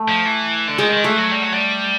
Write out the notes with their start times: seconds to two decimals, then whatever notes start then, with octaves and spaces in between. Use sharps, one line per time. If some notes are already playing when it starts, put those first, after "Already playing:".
Already playing: A3
0.08 F3
0.25 E3
0.68 D3
0.78 D#3 G#3
0.91 D#3
1.04 E3 A3
1.17 F#3
1.31 G3
1.42 F#3
1.52 G3